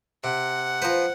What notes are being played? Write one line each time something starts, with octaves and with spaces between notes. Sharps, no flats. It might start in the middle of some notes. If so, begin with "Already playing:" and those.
C3 F#5
F3 B4 C5 A#5